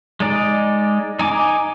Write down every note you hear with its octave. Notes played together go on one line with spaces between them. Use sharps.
G#3 D#4 D5
D#4 G#5 D6